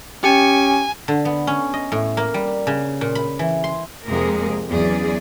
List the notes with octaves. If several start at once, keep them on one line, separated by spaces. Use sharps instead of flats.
C#4 G4 G5 G#5 C#7
D3
B3
C#4
D#5
A2
A#3
G3
C#3
A#2
B5
E3
C6
F2 C3 G#3 A#3 G#4 A#4
E2 F#3 C#4 G#4 D5